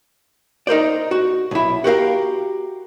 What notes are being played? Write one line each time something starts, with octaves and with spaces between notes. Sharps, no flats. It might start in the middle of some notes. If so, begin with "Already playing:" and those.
D#4 A#4 C5 D5
F#4
B1 E4
F#4 G4 A#4 F5